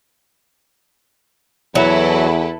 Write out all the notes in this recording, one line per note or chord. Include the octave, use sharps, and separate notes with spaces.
E2 F#3 E4 A4 B4